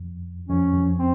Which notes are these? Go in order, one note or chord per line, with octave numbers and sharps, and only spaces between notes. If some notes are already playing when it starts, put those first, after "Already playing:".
Already playing: F2
F2 C#4
F2
C4